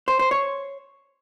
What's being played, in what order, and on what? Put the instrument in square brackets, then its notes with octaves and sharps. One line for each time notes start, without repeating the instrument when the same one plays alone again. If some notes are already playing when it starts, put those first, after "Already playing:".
[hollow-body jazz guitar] C5
C5
C#5